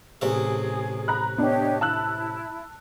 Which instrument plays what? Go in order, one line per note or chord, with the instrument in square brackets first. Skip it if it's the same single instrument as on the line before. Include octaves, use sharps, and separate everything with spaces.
[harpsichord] A1 C3 E5 [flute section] G#4
[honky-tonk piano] A#5 B5 F#6
[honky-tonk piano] B3 D4 [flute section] G4 C#5 D#5
[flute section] E4 [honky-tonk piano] A5 E6 F#6